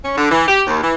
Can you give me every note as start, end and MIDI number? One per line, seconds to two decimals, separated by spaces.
0.05 0.15 61
0.17 0.29 50
0.32 0.48 52
0.48 0.62 67
0.67 0.82 39
0.83 0.94 52